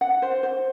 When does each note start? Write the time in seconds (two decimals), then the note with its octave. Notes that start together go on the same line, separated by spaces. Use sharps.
0.01 F#5
0.22 C5
0.43 C5